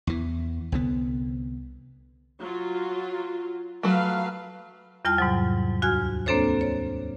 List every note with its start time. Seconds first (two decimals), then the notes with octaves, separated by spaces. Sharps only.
0.07 E2 E3
0.72 C2 D3 B3
2.40 F#3 F4
3.83 F#3 A3 B4 F5
5.05 E2 G3 F4 A5 F6
5.18 G#2 C3 F#3
5.82 D2 F#4 G#5 F6 G#6
6.26 A#3 C4 D4 A4 C5 C#5
6.61 C#5